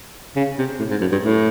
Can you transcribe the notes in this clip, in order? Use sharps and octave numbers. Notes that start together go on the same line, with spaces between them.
C#3
C3
A2
G#2
F#2
G2
A2